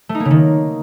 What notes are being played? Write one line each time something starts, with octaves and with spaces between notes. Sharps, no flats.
A3
D#4
A#3
C#3
D#3